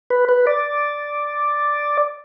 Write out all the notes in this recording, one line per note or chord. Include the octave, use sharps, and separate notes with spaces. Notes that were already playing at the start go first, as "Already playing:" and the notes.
B4
B4
D5